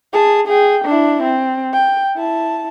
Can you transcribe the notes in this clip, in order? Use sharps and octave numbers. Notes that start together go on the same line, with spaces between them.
G#4 A5
G#4 G5
D4 E4
C4
G5
E4 A5